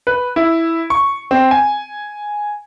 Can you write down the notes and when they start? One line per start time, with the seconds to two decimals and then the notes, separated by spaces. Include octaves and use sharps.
0.07 B4
0.36 E4
0.90 C#6
1.31 C4
1.51 G#5